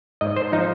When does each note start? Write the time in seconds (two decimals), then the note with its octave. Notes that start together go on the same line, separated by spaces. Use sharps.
0.21 G#2 D#5
0.36 C5
0.52 F3 D#4